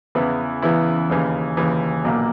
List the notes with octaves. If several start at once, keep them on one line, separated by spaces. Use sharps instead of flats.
E2 C#3 E3 B3 E4
E2 C#3 E3 B3 E4
D#2 C#3 E3
D#2 C#3 E3
B1 A#2 A#3